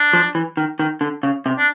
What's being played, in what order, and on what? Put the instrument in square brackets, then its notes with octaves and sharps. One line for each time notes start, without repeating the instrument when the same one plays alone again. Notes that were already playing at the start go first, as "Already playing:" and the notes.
Already playing: [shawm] D4
[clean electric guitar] F3
E3
D#3
D#3
D3
C#3
C3
[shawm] D4